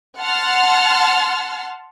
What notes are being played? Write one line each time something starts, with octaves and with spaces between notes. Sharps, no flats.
F#5 A5 C6 F6